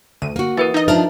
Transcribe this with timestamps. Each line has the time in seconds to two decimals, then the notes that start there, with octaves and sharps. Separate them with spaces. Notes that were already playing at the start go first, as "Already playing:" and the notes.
0.22 D2 D#7
0.36 A#3 F#4
0.57 E3 A#4 B4 A6
0.74 D#4 D#5
0.88 F3 D4 A#4 E5